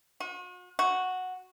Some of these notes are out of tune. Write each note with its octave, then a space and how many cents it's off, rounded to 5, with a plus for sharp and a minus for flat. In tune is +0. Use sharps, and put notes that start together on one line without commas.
F#4 -45
F#4 -5